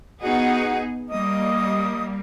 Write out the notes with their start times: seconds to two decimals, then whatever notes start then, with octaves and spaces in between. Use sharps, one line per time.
0.21 B3 D#4 F#4 G#4 F#5
1.10 G3 A#3 D#5 D#6